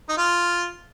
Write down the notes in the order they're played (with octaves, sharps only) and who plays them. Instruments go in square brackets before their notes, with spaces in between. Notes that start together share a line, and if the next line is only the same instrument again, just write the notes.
[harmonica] D#4
F4